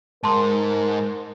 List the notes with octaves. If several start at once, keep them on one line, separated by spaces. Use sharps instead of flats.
G#2 A#4 A5 C6